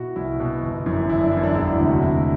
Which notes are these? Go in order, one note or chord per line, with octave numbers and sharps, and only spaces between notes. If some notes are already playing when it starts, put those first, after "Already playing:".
Already playing: B2 E4 F#4
C2 E4
B2
G1
F#2 E3
G1 E4
D4
F#2 E3 E4
D4
E1 E4
D4
D2 C3 E4
F#4
E1 E4